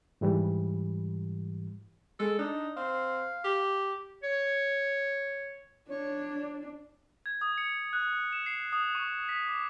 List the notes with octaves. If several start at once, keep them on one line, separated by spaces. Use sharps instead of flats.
G#2 E3 G3
G#3 A4
D4 D#4
C4 F5
G4
C#5
D4 C#5
G#6
D#6
C#7
F#6
E7
C7
D#6
C#6
B6
D6